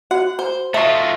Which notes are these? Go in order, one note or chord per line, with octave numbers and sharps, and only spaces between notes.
F#4 F#5
C5
A3 F4 D#5 E5 C#6